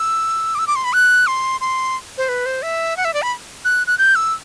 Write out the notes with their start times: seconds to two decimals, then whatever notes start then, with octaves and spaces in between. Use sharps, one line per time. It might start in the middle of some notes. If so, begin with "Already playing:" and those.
Already playing: E6
0.55 D6
0.59 E6
0.67 D6
0.76 C6
0.84 B5
0.93 F#6
1.27 C6
1.61 C6
2.18 C5
2.29 B4
2.46 C5
2.63 E5
2.97 F#5
3.05 E5
3.14 D5
3.22 B5
3.65 F#6
3.87 F#6
3.98 G6
4.15 E6